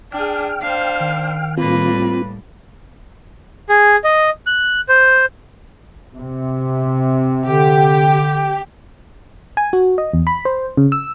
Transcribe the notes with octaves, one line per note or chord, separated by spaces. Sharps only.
D4 G#4 G5 F6
D4 C5 F5
D#3
A2 G3 A#3 C4 F4 B4
G#4
D#5
F#6
C5
C3
D3 G4
G#5
F#4
D#5
E2
B5
C5
C#3
E6